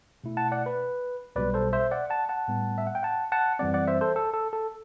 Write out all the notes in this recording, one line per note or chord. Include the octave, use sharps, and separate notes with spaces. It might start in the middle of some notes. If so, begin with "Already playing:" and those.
B2 A3 E4
F#5 A5
D5 F#5
B4
B1 B2 G3 B4 D5
A4 C5
C5 E5
D5 F#5
F#5 A5
F#5 A5
A2 G3 B3
E5
F#5
G5
F#5 A5
F#5 A5
F#2 E3 G3 C4 D5 F#5
D5 F#5
C5 E5
A4 C5
A4
A4
A4